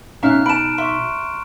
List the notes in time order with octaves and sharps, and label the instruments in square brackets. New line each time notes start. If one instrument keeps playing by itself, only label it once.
[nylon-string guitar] B2 D#4 [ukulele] C#4 E5 F5 [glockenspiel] A#5 F6 F#6
[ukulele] A5 B5 [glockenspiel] D7 E7
[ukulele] E5 [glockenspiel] C6 C#6